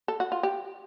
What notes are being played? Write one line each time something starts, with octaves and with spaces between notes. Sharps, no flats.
A4
F#4
F4
G4